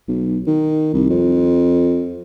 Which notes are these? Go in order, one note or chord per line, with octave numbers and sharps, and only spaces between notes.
B1
D#3
C2
F2